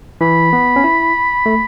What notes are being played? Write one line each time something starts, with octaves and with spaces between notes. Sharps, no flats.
E3 B5
B3
C#4
E4
A3